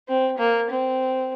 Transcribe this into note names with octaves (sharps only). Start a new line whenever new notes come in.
C4
A#3
C4